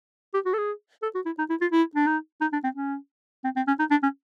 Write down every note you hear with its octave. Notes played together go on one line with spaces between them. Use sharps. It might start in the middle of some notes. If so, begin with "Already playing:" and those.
G4
F#4
A4
G#4
A4
F#4
E4
D#4
E4
F4
E4
D4
D#4
D#4
D4
C4
C#4
C4
C4
C#4
D#4
D4
C#4